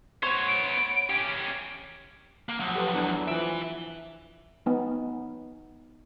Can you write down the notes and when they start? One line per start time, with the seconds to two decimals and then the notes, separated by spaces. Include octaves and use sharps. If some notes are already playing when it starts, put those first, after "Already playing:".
0.23 B3 C5 C#5
0.48 D7
1.10 C#4 G4
2.49 A#3
2.60 F3 F#3
2.75 G4 A4 B4
2.93 E2 E3 D4
3.28 E3 F3 B4 E5 D7
4.66 B3 D#4